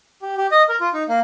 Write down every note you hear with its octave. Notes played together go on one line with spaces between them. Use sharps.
G4
G4
D#5
A#4
F4
D#4
A#3